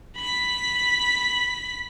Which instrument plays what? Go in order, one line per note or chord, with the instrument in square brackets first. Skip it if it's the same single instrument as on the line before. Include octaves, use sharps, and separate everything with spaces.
[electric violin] B5 B6